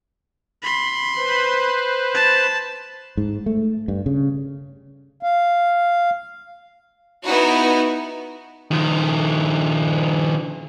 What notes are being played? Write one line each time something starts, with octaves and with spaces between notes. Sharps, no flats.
B5 C6
B4 C5
A5
G#2
A3
G2
C#3
F5
B3 D#4 E4 F#4
D#3 F3